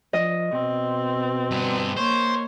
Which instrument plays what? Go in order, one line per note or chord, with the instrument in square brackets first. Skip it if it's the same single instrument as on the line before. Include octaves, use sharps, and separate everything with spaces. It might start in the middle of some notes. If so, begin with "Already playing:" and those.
[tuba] F3 [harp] D#5
[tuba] B2 [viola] C4
[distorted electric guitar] G2 B3
[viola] A#3 C#5 [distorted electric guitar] C5